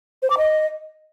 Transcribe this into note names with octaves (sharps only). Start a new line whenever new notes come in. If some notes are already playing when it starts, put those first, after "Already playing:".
C5
D6
D#5